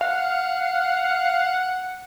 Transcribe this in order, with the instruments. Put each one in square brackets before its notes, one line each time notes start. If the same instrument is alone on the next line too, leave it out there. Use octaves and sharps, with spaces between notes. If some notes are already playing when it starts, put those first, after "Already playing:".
[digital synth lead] F5 [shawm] F#5